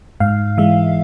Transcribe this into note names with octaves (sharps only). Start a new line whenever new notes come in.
G#2 F5
E3 G#3 E5